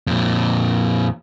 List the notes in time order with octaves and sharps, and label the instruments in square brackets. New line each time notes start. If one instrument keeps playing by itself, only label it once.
[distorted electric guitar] F2 A#2